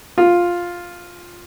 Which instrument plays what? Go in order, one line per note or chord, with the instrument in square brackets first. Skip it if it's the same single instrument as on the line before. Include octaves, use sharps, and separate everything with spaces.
[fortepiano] F4